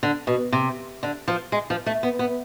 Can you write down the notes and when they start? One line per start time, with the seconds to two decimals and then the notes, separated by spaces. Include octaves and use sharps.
0.03 D3
0.27 B2
0.52 C3
1.03 D3
1.28 F3
1.52 G#3
1.70 F3
1.86 A3
2.03 B3
2.19 B3